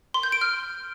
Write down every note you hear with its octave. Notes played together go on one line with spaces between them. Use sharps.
C6
G6
D7
F6